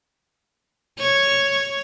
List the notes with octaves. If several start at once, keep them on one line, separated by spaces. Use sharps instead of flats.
C#5